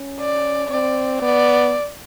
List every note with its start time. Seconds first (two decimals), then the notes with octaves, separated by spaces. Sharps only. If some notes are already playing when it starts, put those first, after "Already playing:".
Already playing: C#4
0.19 D5
0.69 C4 D5
1.22 B3 D5